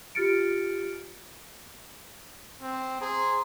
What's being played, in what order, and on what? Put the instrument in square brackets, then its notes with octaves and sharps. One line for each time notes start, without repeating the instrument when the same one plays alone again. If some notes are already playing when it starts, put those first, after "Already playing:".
[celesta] F4 G4 F6 A6 C#7 D7
[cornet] C4
[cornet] G#4 [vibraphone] C5 A#5 C6